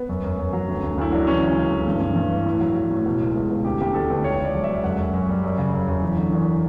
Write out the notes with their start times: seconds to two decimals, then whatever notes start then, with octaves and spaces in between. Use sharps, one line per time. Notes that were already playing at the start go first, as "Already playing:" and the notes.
Already playing: B3
0.09 F#2
0.24 F#2
0.39 F#2
0.53 F#3
0.68 D2
0.83 D2
0.98 D2 E4
1.12 F#3 D4
1.27 E3 C#4
1.43 C#2
1.57 C#2
1.71 E3
1.87 G2
2.01 G2
2.16 G2
2.31 E3
2.46 A2 E4
2.60 F#3
2.75 F#3
2.90 A2
3.06 B2
3.21 C#2
3.35 C#2
3.50 B2
3.64 D2 G4
3.80 D2 G4
3.94 D3 A4
4.10 D2 B4
4.24 C#2 C#5
4.39 C#2
4.44 D5
4.54 F#3
4.64 E5
4.69 C#2
4.84 F#2 F#5
4.98 F#2
5.14 F#2
5.29 G3
5.44 F#2
5.58 C#3
5.73 F#2
5.89 F#2
6.02 E2
6.18 D3
6.32 E2